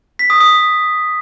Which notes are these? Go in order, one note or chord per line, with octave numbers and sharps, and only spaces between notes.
B6
D#6
D#6